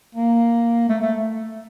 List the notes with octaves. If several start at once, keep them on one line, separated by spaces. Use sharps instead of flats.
A#3
A3
A3